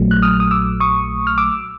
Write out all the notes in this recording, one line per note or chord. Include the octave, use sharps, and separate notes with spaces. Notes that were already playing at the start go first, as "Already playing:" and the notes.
Already playing: A#1 A#2 F#3 A3
F#6
D#6 F6
D#6
D6 E6
C#6 D#6
F6
D6 E6